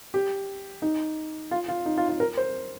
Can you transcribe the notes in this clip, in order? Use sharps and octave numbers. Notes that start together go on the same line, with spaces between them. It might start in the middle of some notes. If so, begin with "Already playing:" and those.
G4
D#4
F4
F4
D#4
F4
F4
A#4
C5